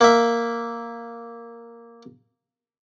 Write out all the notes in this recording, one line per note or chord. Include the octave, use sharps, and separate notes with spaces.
A#3 E5